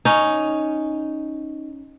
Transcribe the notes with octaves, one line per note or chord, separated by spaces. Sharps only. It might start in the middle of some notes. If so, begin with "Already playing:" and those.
C#4 D#4